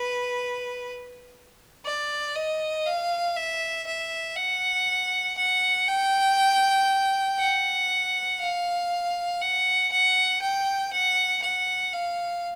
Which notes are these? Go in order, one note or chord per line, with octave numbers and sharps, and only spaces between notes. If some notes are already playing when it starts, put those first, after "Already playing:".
Already playing: B4
D5
D#5
F5
E5
E5
F#5
F#5
G5
F#5
F5
F#5
F#5
G5
F#5
F#5
F5